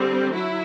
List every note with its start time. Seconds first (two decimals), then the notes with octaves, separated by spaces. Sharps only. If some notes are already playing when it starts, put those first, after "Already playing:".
Already playing: D3 G3 C4
0.33 F#3 E4